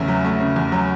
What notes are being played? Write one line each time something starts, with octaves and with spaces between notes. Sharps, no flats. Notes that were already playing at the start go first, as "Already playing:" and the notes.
Already playing: E2 C#3 A3 E5
F#3
A3
C#3
E2
F#3